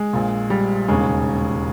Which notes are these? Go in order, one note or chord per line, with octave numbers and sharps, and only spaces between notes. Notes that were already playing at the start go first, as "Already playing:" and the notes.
Already playing: G#3
A#1 A#2
G3
E1 D#2 C#3 G#3